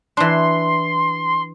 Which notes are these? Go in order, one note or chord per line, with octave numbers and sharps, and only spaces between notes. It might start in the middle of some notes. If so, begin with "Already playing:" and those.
E3 D4 C6